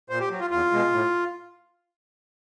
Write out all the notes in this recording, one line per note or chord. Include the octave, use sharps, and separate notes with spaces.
A#2 C5
G4
F#3
F4
E2 F4
B2 G#3
A2